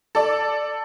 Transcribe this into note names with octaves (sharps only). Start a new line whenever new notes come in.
A4 D5